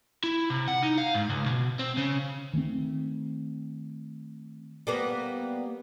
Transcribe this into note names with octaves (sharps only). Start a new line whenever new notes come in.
E4
C3
F#5
D#4
F5
G#2
C#2
B2
C4
C#3
D#3 A3 B3 C4
G3 A#3 B3